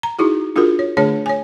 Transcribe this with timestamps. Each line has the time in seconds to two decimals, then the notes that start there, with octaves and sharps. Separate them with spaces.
0.03 A#5
0.19 D#4 E4 F#4 G#4
0.56 D4 F4 F#4 G#4 A#4
0.79 C#5
0.97 D3 A3 D4 G#4 C#5 A5
1.26 C#5 G#5